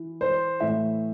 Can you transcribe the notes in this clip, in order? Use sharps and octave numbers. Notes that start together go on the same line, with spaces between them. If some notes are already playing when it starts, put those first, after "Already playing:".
Already playing: E3
C5
A2 E3 E5